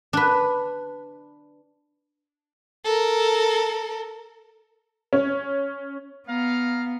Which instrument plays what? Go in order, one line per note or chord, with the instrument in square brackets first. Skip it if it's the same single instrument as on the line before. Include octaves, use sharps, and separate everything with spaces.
[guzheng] D4 B4
[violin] A4 A#4
[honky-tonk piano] C#4
[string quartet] B3 [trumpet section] F5 A#5